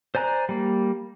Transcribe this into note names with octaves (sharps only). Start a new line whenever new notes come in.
C5 D5 G#5 A#5 F#6
G3 A#3